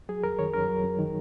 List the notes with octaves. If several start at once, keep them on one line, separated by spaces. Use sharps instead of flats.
F#3 G#4
F#2 A#4
D#3 C#5
F#2 A#4
F#3
F#2
D#3